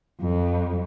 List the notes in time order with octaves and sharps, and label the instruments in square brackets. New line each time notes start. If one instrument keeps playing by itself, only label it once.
[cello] F2